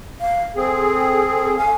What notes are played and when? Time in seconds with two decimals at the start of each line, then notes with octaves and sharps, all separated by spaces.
0.21 F5
0.56 C4 G#4 A4
1.57 F5 G#5